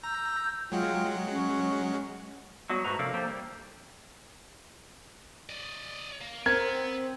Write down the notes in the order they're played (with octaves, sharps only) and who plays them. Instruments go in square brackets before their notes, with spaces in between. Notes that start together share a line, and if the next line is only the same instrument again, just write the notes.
[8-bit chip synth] A#5 [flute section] E6 G6
[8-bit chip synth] F#3 G#3 F#5 [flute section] F4 G5
[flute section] C#4
[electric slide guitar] F#3 G3 B3 F#4
G#2 A3 F#4 B4 A#5
C3 F3 D4 A4 A#4 F5
F3 A#3 G4 A4
G3 A#3
[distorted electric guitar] D5 D#5
A#3
[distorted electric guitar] B3 [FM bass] C4 [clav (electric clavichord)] A#4 [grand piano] G#6